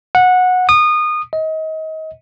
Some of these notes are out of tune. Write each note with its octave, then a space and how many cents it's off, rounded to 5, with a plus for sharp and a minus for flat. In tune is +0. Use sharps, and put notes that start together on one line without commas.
F#5 -15
D#6 -25
D#5 +30